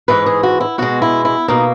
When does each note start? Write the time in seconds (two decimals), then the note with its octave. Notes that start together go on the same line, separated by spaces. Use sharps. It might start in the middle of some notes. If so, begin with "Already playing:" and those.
0.08 G#2 E3 G#3 B4
0.26 G#4
0.43 F#4
0.61 E4
0.78 B2 G#3 F#4
1.02 E4
1.25 E4
1.48 B2 A#3 D#4